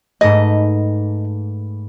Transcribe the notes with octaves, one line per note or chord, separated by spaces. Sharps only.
G#2 A3 B4 D#5